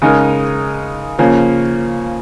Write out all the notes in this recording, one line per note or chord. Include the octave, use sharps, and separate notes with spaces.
C#3 G#3 D#4 A#4
C#3 F3 A#3 C#4